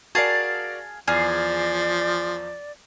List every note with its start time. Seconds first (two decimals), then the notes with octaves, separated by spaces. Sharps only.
0.15 F#4 G#4 A#4 D5 F5 A5
1.08 E2 F3 G#4 D5 F6